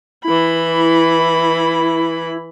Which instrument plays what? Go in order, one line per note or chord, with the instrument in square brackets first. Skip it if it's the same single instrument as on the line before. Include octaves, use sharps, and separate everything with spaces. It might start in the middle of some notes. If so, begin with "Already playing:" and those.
[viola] E3 B5 [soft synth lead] E4